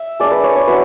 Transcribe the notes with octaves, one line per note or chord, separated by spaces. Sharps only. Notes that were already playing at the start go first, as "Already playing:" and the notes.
Already playing: E5
G#3 D4 D5
B4
C#5
C#5
F#3 C#4 E4 B4